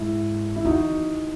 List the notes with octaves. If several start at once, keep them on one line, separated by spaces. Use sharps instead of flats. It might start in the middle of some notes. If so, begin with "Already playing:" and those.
Already playing: G#2 E4
E4
E2 D#4 F#4